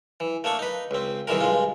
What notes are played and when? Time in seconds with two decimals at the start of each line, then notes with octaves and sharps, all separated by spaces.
0.20 E3
0.44 A3 A#3 D4 C#6
0.59 D#4 B4
0.91 C#2 C4
1.27 C2 C3 D#3 E3 G#3 A#4
1.41 G2 G#3 F4